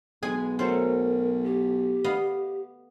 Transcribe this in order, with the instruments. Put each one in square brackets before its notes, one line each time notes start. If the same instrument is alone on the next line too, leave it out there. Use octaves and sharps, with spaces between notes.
[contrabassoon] B1 [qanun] G#3 B4 G#5 [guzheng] G#4
[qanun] F#3 A3 C#4 [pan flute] A#4 [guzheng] C5
[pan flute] G4
[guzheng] B3 D#5 F5